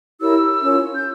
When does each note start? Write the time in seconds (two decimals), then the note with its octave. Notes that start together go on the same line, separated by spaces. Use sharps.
0.20 E4 G4 A#4 C#5 E6
0.62 C#4 F4 A#4 C#5
0.94 G6